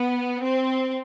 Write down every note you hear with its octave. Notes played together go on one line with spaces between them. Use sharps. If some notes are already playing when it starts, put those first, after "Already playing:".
Already playing: B3
C4